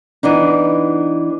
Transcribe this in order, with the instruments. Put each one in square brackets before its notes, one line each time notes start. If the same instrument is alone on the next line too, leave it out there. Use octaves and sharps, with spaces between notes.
[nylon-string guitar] E3 B3 D4 D#4